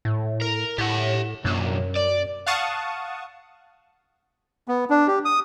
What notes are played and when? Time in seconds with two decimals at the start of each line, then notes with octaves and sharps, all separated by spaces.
0.05 A2
0.41 A#4
0.78 A2 G4 F#5
1.45 B1 F#2 A#3
1.96 D5
2.46 F5 F#5 A5 C#6 D#6
4.68 B3
4.90 D4
5.08 G4
5.25 D#6